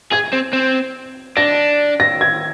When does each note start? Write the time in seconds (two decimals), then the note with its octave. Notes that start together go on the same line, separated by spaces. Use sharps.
0.12 G#4 G#6
0.33 C4
0.53 C4
1.37 D4 A#6
2.00 A#6
2.21 G#6